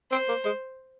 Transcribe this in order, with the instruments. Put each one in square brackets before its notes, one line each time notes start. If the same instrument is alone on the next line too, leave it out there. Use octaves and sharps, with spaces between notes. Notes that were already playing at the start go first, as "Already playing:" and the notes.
[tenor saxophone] C4 [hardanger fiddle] C5
[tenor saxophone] A#3
G#3